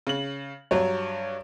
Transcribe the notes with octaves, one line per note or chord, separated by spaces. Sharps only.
C#3 F#7
G2 F#3 C#5